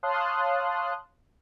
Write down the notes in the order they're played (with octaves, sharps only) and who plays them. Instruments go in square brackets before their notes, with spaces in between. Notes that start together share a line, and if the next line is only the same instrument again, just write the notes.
[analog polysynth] C#5 F5 A5 C6 D#6 F#6